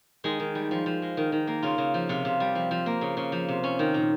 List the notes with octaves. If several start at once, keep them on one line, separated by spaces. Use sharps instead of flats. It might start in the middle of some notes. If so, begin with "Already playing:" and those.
D#3 G#3 G#4
D#3
G3
F3
F3
G#3
D#3
D#3
A#3
C#3 F4
C#3
F3
C3 F4
C3
G3
F3
F3
A#3
C#3
C#3
F3
C3
C#4
D#3
A#2